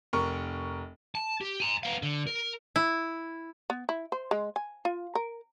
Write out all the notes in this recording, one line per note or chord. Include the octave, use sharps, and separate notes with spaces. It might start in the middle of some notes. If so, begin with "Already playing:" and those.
F1 A#4 C#6
A5
G4
G#5 A#5
B3 F5
D3
A#4
E4
B3
E4
C5
G#3
G#5
F4
A#4